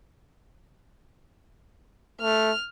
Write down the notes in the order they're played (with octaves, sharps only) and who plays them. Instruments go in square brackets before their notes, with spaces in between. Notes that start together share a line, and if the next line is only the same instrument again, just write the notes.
[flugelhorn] A3 [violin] F6